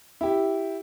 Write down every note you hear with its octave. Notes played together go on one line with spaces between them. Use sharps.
E4 G4